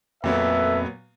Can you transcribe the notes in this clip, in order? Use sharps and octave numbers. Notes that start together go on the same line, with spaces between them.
F2 A#2 F#3 B3 A4 B4 E5